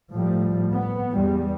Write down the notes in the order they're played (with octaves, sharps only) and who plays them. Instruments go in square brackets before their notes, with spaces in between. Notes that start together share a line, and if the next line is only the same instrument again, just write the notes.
[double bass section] A2 F3 G3
B3
E2 G3